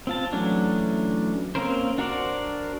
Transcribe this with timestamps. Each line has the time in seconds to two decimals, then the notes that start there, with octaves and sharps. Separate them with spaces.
0.07 C4 F4 A5
0.33 E3 F#3 A3 C#4 D4
1.55 A#3 C4 C#4 A#4 C5
1.98 D4 F#4 A#4 C5 D5